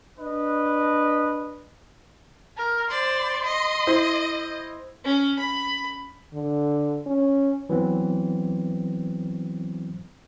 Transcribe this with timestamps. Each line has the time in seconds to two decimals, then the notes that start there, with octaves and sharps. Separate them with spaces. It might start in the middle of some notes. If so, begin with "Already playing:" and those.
0.19 D4 B4 D#5
2.57 A#4
2.90 C5 D5 C6
3.44 D#5
3.87 E4 C5
5.05 C#4
5.39 B5
6.34 D3
7.07 C#4
7.69 E3 F#3 B3 C4